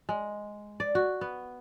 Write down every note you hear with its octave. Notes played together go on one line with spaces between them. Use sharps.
G#3
D5
F#4
B3